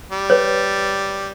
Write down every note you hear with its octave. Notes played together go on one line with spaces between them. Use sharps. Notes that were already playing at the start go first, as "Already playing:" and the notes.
G3
B4 C#5